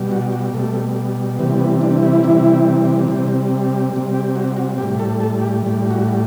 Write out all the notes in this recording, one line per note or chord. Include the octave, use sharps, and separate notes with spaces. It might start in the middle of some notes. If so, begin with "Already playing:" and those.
Already playing: B2 G3
F#4
F#4
B2 G3 A3
C3 E3 G3 B3
B3
D4
E4
C3 E3 G3
C3 G3
C3 G3
G4
F#4
F#4
A2 G3 G4
A4
A4
G4
A2 G3
F#4